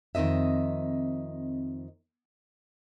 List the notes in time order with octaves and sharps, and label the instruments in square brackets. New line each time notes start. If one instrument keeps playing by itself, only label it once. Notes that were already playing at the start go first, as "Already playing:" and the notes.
[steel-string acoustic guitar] F2 D#3 C4 D#5 E5